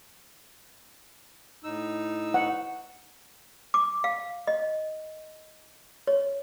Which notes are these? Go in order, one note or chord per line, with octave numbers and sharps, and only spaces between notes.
A2 D#4 E6
F#5
D6
F5
D#5
C#5